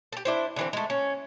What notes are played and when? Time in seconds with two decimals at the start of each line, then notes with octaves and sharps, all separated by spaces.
0.12 G4 A4
0.25 D4 E4 C5
0.56 D3 E3 C4
0.73 G#3 A3
0.90 C#4